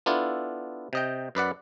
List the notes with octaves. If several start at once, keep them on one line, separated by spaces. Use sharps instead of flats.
B3 D4 E4 F4 A4
C3 D#5 G5
F#2 B4 D5 F#5